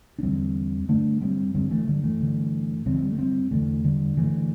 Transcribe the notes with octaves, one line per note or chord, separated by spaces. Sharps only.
D4
E2 D3 G3 C4
G2 D3 A3 D4
G3 C4
G2 D3 G3 C4
E3 A3
D3 G3
E3 A3
G2 D3
G2 D3 G3 C4
E3
G3
A3
G3 C4
E2 D3 E3 A3
D3 G3
G2 D3 E3 A3